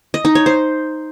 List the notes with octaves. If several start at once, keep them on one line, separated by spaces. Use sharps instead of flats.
D#5
D#4
C#5
C5